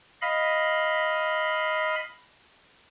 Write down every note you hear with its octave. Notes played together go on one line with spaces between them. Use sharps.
D#5 F5 B5